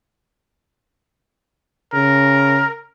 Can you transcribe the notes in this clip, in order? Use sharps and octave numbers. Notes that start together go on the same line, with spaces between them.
C#3 A#4